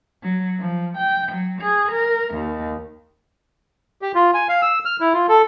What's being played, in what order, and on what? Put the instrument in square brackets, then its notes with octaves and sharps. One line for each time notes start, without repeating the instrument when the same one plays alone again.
[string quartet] F#3
F3
G5
F#3
G#4
A#4
D#2
[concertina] G4
F4
G#5
F5
E6
F6
E4
F4
A4